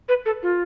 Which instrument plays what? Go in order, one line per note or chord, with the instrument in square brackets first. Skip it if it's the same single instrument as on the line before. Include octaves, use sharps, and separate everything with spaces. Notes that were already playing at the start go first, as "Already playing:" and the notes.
[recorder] B4
A4
F4